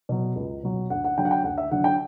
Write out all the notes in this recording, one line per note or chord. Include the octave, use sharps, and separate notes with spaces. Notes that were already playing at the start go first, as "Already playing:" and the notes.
B2 F#3
C#2
B2 F#3
D2 F#5
F#5
D3 F#3 G5
F#5
G5
D2 F#5
E5
D3 F#3 F#5
G5